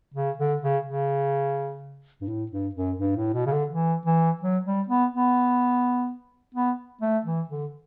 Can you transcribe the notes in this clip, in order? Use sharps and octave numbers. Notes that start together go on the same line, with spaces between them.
C#3
D3
C#3
C#3
G2
A2
G2
F#2
G2
A2
B2
C#3
D3
E3
E3
F#3
G3
B3
B3
B3
A3
E3
D3